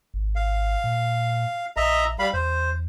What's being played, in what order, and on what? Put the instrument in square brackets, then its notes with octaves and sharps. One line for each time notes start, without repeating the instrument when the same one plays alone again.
[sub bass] G#1
[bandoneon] F5
[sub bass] A#2
[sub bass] A#1 [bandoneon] D#5 E5 A#5
[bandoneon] G3 F5 B5
[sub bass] E2 [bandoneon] C5